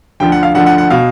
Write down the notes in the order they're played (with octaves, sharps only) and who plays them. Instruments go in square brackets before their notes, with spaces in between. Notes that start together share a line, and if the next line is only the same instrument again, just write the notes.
[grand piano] D2 D3 F3 G5
F#5
F5
D2 D3 F3 F#5
F#5
F#5
B2 F5